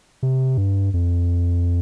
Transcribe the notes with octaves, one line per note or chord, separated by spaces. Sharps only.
C3
G2
F2